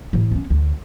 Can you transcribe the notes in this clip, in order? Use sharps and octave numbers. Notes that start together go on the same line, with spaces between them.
A2 E3
B3 C#4
D2